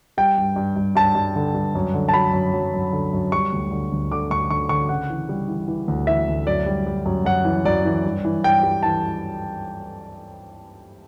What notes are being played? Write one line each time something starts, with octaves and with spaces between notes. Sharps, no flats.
G3 G5
G2
G2
G2
G2 A5
G2
D3
G2
F#2
D3
A5
F#3 B5
F#2
F#3
F#2
D3
F#2
G3 C#6
D2
D3
D2
D3 D6
D2 C#6
D3 C#6
D3 C#6
C#3 F#5
E3
G3
E3
E3
D2
E3 E5
D2
F#2 D5
G3
G3
F#2
F#2 F#5
E3
F#2 D5
E3
G2
E3
G2 G5
G3
E3 A5